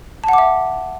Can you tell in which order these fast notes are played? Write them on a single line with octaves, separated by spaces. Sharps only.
A5 F#5 D6 E5